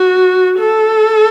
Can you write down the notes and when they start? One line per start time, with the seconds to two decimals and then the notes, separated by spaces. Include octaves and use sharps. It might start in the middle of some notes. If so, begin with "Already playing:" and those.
Already playing: F#4
0.59 A4